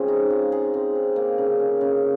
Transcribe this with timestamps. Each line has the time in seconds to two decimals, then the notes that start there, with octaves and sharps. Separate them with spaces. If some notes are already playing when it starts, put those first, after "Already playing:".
Already playing: G#3 C4 C#4 F4 G#4
0.08 D#4
0.30 F4
0.52 G#4
0.74 C4
0.95 D#4
1.16 A#3
1.38 C#3
1.59 C#4
1.81 C#3